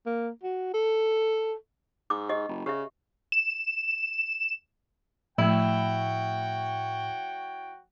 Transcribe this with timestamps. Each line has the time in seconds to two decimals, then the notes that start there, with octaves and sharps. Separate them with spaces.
0.06 A#3
0.43 F#4
0.74 A4
2.10 G#2 D6
2.29 G4 D#5
2.49 F#1
2.66 C#3 G4 E5
3.32 E7
5.38 A2 F3 A3 E4 F#4 C#5 G5